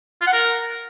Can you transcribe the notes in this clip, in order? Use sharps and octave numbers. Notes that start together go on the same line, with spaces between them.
F4
F#5
A#4